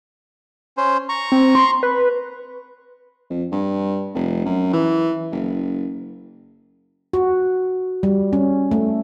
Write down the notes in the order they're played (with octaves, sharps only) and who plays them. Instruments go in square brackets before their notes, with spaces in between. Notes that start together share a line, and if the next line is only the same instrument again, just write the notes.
[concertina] C#4 C5
A#5 C#6
[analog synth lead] C4
C6
B4
[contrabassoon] F2
G2
F1
F#2
E3
F#1
[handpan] F#4
G3
C#4
A3